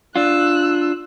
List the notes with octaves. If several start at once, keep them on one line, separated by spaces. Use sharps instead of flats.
D4 F4 E6 F#6